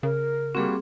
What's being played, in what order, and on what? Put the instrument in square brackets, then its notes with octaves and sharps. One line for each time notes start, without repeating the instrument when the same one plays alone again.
[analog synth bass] C#3 [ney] A#4
[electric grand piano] G3 A#3 F#4 [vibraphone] C4 G#4